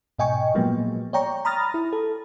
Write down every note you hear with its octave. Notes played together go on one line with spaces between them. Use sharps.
G#2 B2 D#5 G5 G#5 C#6
A#2 F3 F#3 G#3 A#3 B3
C#5 D5 G5 A#5 C#6
A#5 B5 D#6 F6 A6 A#6
E4
A4